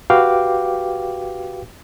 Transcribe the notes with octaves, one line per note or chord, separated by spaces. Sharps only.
F#4 G4 B4 F5 G5 D6